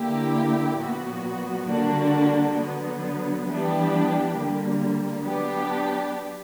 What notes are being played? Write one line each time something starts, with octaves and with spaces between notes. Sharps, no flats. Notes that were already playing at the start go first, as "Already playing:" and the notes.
Already playing: D3 A#3 E4 G4
A#2 F#3 B3 F#4
D3 G3 A#3 D4 F#4
D3 F#3 B3
E3 G3 B3 D4 G4
D3 G3 A#3
F#3 B3 D4 G4